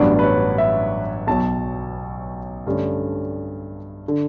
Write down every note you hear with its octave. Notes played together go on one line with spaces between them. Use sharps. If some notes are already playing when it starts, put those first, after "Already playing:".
Already playing: A1 G2 F#3 B3 D4 D5
B4
C#5
E5
B1 B2 F#3 A5
G2 D3 A3 C#4
D3